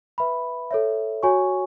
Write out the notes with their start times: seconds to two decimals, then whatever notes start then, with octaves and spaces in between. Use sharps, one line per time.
0.18 B4 E5 B5
0.71 A4 C#5 E5
1.23 F#4 C#5 G#5 C#6